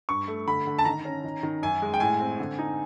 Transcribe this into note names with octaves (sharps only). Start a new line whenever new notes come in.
G2 C#6
A3
D3 B5
D3
A5
D#3 A#5
C#4
D#3
D#3
F#2 G#5
G#3
G5
A2 G#5
C4
D3
D#4